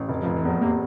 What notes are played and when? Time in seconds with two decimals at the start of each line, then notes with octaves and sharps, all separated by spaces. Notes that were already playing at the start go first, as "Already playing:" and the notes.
Already playing: A1
0.09 F1
0.22 F1 F3
0.36 E3
0.45 E2 F3
0.61 C3 A#3